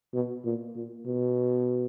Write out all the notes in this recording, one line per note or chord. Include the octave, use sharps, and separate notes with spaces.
B2
A#2
A#2
B2